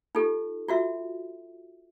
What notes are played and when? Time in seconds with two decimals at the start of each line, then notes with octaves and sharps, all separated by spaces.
0.15 D#4 F4 G4 A4
0.68 F4 F#4 E5